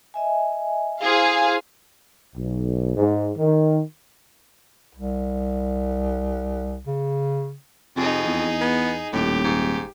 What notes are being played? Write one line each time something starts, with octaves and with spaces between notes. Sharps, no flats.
D#5 E5 G#5
E4 G#4 C5 F5 C6
B1
G#2
D#3
C2
C#3
F2 C3 D#4 G#4
E2
B3
D#1 A2 G4
G#2